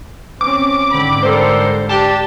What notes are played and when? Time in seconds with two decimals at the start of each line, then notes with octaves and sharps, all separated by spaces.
0.41 C4 C#4 D6
0.91 G#2 D3 C4 B5
1.23 G3 A4 A#4 C5
1.89 D4 G4 A5